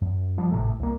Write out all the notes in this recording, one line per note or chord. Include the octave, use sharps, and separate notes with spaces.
F#2
F3 G3
G#1 A2 C3 A3
C2 A#3